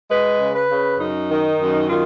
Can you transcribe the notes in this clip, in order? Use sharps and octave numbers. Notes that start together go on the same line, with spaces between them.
G#3 B4
C#3
B4
C#3
F#2 D#4
D#3
F#2
D#3 F4